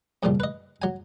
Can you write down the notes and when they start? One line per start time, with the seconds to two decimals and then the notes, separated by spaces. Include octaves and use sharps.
0.23 F2 A#2 C#3 F3 G3
0.40 B4 D#5
0.82 F#3 G#5